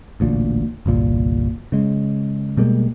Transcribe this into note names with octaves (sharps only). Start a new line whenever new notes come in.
A1 D2 A#2
G1 C2 A#2
C#3 G#3
B2 G3 G#3 A#3